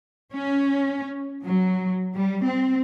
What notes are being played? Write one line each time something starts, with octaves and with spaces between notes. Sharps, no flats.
C#4
F#3
G3
C4